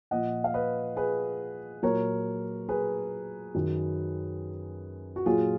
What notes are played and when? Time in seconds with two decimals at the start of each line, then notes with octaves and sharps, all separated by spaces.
0.11 A#2 F3 D#5 F#5
0.44 F5
0.54 B4 D#5
0.97 G#4 B4
1.83 A#2 F#3 A#4 C#5
2.69 G#4 B4
3.55 F#2 D#3 F#3
5.16 F#4
5.26 A#2 F#3 F4 G#4